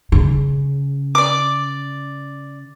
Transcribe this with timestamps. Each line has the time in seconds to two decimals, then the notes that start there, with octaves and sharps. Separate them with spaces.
0.12 C#3
1.15 D5 D6